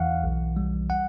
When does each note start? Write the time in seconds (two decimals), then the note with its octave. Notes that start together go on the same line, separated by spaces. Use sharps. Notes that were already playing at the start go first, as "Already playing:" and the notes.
Already playing: E2 E3 F5 F#5
0.23 B1
0.56 G3
0.90 F#5